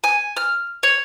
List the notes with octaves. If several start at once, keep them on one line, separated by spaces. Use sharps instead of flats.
G#5
F6
C#5